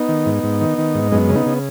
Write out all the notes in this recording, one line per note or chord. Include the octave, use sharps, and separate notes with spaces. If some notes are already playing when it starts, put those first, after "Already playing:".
Already playing: B3 D#4
D#3
G#2
G#2
D#3
D#3
G#2
F#2 G#3 B3
C#3
B3 D#4
C#3